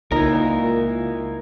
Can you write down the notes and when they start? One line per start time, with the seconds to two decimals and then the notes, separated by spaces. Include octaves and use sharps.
0.12 C#2 A#2 D#4 E4 A#4